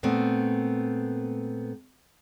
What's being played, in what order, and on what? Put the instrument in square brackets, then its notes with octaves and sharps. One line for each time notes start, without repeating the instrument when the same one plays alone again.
[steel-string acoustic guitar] A#2 A3 B3 C4